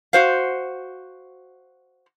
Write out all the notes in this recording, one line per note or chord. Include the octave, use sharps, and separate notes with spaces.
F#4 C5 F5